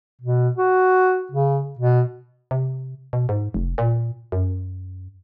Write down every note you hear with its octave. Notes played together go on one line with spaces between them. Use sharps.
B2
F#4
C#3
B2
C3
B2
G#2
F1
A#2
F#2